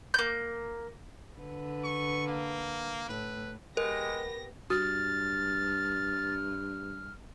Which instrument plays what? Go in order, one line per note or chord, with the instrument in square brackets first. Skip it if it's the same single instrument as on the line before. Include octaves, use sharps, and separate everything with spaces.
[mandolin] A#3 G6
[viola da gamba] D3 B4
[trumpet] C#6
A#3
[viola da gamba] A2 [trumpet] B4
[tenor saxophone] G#3 [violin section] B3 G4 A#6 [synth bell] A#4
[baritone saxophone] G2 [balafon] F#4 [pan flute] F6 [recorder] A6